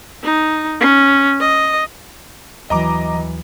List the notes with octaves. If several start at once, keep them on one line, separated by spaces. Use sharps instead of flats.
D#4
C#4
D#5
D#2 E3 F#3 D#5 A#5 D6